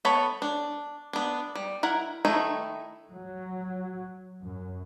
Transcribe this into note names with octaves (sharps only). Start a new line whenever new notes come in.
B3 A4 C#5 B5
D4
B3 D4
G3
E4 A#4 F#5
D#3 A3 D#4 E4
F#3
F#2